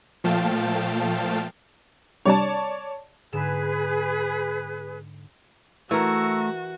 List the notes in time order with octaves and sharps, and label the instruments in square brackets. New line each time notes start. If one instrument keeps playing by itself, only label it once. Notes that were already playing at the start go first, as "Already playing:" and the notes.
[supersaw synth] A#2 F3 A3 F5 G5 A5
[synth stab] C3 G3 D4 [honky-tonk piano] C#5 D5 A5
[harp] G#2 D3 E7 [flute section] G#4 B4
[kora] E3 A#4 [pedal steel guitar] A3 [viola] F#4 [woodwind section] A#5 C#6 E6